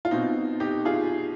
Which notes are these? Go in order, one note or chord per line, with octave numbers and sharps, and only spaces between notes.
F4
B2 C4 D#4
D#4 G4
F4 G#4